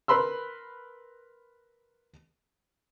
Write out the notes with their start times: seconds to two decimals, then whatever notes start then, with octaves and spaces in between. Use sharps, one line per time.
0.08 A#4 B4 B5 C6 E6